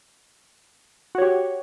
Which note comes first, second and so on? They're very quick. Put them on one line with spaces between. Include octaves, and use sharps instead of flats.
F#4 C#5 G4